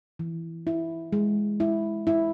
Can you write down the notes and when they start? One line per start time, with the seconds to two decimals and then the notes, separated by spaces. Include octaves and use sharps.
0.19 E3
0.67 E4
1.12 G#3
1.60 E4
2.07 E4